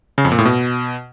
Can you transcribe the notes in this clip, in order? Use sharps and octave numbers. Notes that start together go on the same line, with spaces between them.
C#3
F2
A#2
A2
B2